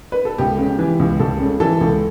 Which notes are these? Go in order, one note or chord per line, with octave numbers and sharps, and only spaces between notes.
B4
A4
C#2 G4
C#3
E3
C#2
C#2 A4
C#3
E3 A4
C#2